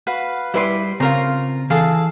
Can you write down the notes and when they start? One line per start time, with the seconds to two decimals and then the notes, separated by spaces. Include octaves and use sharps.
0.07 F#4 B4 F5
0.54 G3 E4 B4 D5 C6
1.00 C#3 C4 F4 A#4 A#5
1.70 E3 G#4 A4 F5